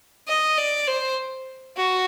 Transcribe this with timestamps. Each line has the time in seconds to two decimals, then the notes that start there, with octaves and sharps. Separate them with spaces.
0.28 D#5
0.58 D5
0.87 C5
1.76 F#4